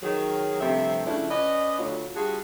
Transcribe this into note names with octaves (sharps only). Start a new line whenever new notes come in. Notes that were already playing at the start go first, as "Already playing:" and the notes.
D#3 F#3 G#4
G2 C3 F3 A3 C4 E5
C#3 F3 A3 C4 D4 E4
C#4 B4 D5 D#5
D2 F#3 F4
G3 D4 F4 F#4 G#4